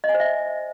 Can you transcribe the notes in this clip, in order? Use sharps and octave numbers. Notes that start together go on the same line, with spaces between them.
D#5
G#5
C5
E5